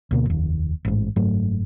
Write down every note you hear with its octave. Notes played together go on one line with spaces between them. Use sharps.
D2 B2 A#3
F1 D#2
A1 G#2
F#1 G#2 F#3 A3